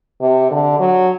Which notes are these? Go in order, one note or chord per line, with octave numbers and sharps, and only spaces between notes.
C3
D3
F#3